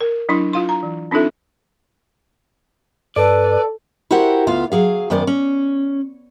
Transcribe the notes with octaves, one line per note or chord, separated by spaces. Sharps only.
A#4
F#3 D4 E4 C6
F4 F5 C6
A#5
E3
C4 D4 D#4 F4 A4 E5
G2 A4 B4 D5
E4 F#4 G4 A#4 C5 F#5
D2 B3 F4 F5
F#3 G#4 F5
F#2 D#3 B3 C5 D5
C#4